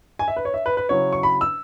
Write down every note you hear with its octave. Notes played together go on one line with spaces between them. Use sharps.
G#5
E5
B4
C#5
E5
B4
B4
C#3 F#3 C#4 E4 C#5
C#6
B5
E6